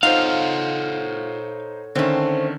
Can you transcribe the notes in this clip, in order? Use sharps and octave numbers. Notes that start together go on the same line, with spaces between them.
D#4 F4 A4 C5 C#5 F5 F#5
D3 D#3 A3 C4 C#4